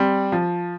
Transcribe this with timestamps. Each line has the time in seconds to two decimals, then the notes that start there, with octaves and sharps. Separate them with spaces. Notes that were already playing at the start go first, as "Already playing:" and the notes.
Already playing: G3 C4
0.32 F3